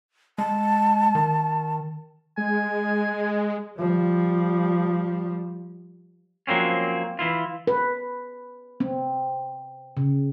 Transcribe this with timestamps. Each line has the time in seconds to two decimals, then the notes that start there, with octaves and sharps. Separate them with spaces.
0.38 G#3 A5
1.15 D#3
2.37 G#3 G#5
3.78 F3 G3
6.47 F3 F#3 A#3 C4 C#4
7.19 E3 E4 F4
7.67 B4
8.80 C4
9.97 C#3